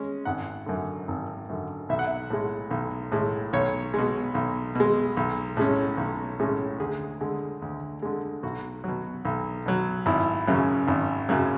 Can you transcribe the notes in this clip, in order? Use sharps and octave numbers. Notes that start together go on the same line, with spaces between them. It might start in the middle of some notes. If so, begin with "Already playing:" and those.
Already playing: G#3 C#4
G#1 F#5
F#2 D3
G#1
F#2 D3
B1 E5
F#5
E5
A2 G#3
B1
A2 G#3
B1 C#5
B2 G#3
B1
B2 G#3
B1
A2 G#3 C#4
B1
A2 G#3 C#4
D2 G#4
D3 G#3
D2
D3 G#3
B1 F#4
B2 F#3
B1
B2 F#3
G#1 E4
F#2 C#3 F#3
G#1
F#2 C#3 F#3